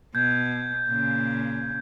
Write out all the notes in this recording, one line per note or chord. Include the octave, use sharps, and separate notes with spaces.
B2 G6 G#6
A#2 C#3